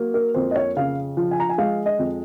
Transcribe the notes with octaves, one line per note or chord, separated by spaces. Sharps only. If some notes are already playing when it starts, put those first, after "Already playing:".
Already playing: F#3 A#3
A#4
F2 C5
D#5
C#5
C#3 F5
F3
G#5
A#5
G#5
G#3 F5
D#5
F2